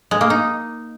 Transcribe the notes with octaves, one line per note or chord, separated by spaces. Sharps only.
G#3
A#3
D#4